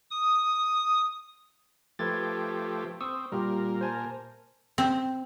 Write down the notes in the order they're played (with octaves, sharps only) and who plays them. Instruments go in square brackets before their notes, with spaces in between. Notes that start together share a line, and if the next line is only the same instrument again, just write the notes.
[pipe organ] D#6
[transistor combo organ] F3 A3 G4 [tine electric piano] B4 G#6 A6
[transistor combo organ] C4 [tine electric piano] C#6 D#6 E6
[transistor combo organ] A#2 A#4 [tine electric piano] G3 F4 G4
[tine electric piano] C5 G#5 A5
[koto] C4